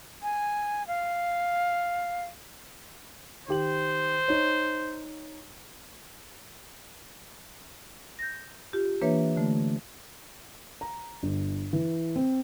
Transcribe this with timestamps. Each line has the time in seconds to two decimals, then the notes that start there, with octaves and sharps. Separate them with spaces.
0.23 G#5
0.87 F5
3.48 D#3 G4 C5 F#7
4.28 D#4 C#5
8.19 G6 A#6
8.73 F4 G4
9.01 E3 A#3 D4 B4 C#5 E5
9.37 D3 A3
10.81 A#5
11.23 G1
11.73 E3
12.16 C4